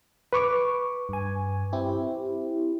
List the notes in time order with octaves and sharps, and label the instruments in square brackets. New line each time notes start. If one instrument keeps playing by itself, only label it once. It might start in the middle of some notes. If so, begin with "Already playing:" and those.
[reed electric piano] B4 C#6 D6
[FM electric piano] G2 G#5
C4 E4 G4